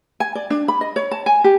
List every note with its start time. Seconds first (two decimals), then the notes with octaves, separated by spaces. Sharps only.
0.20 G#5
0.35 D5
0.50 D4
0.68 B5
0.81 D#5
0.96 C#5
1.11 A5
1.26 G#5
1.44 G4